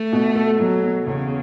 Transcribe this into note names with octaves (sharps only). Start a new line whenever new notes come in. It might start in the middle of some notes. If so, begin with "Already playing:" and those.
Already playing: A3
B2
A4
B2 F#3
B2
E2 C#3